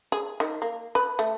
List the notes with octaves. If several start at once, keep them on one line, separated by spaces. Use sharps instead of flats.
G#4
D#3
A#3
B4
A3